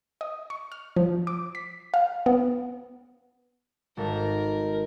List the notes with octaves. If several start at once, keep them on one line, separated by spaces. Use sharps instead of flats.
D#5
C#6
F6
F3
D6
B6
F5
B3
G#1 A4 A#4